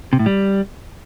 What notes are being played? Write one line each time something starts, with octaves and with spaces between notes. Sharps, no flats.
C3
A2
G3